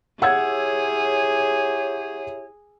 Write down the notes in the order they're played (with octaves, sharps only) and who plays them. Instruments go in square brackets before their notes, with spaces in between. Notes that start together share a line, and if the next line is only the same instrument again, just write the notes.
[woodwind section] E4 G4 C#5 [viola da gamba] G#4 [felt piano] F#5 E6 G#6